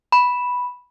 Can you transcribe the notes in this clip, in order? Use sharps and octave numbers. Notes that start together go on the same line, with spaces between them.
B5